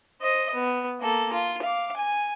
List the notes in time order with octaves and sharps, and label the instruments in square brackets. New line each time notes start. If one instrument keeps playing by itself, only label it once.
[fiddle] C5 D#5
B3
A#3 A4
F4
F5 D6
G#5